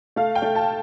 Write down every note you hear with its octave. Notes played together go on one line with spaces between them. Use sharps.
A3 F5
G5
A3
A5